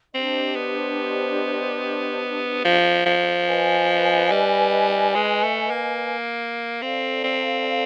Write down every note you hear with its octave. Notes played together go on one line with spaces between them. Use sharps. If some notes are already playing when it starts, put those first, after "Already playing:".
C4 D4 G4 C5 D#5
B3
F3
F3
B4 D#5 G#5
G3
G#3
A3
A#3
C4 A4 D5 F5
C4